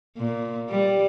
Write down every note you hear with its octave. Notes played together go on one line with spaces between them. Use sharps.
A#2
G3